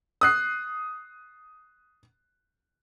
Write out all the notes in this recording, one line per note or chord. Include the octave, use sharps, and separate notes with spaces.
D#6 F#6 C7